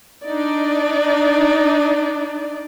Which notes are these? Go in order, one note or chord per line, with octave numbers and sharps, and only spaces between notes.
D4 D#4 D5